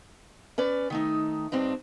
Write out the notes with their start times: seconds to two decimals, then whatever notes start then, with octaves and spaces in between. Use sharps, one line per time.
0.58 C#4 B4 D5
0.90 D#3 A3 D#4
1.52 G2 C4 D4 D#4